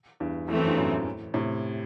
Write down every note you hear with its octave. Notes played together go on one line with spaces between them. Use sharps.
E2 G2
E2 E3 A3 C4
F#2
E2 G2
F#2 A2
A2 C3